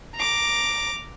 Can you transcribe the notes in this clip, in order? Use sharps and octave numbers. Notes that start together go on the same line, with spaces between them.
A#5 D6